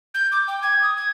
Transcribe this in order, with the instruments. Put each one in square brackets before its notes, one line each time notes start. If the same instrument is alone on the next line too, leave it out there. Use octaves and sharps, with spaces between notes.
[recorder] G6
D6
G5
G#6
D#6
G#6